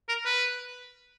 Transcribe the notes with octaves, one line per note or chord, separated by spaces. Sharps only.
A#4
B4